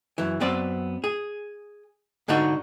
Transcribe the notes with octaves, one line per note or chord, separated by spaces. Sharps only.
F#2 E3
F#2 B3 C4 D5
G#4
G#2 D3 D4 D#4 F#4